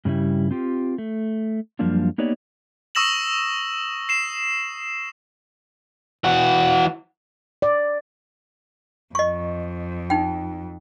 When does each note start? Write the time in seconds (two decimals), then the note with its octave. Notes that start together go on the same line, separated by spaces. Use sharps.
0.05 G2 C#3 G3 E4
0.51 C4 F4 G4
0.98 A3
1.79 F#2 F3 G3 A#3 D4 F4
2.18 A#3 B3 D#4 G4 C#5 D5
2.95 C#6 D#6 E6 A#6 E7 F#7
4.09 C7 E7
6.24 E3 F#4
7.62 D5
9.15 F2 D#5 C#6
10.10 D#4 G5